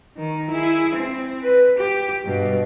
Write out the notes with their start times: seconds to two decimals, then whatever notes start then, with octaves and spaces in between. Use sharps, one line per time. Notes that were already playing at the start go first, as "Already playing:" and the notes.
0.18 D#3
0.50 E4 G#4
0.95 C4
1.42 B4
1.78 G4
2.25 G2 B2